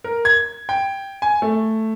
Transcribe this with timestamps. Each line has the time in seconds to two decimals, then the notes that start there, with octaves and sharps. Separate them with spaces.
0.04 A#4
0.25 G#6
0.69 G5
1.22 G#5
1.42 A3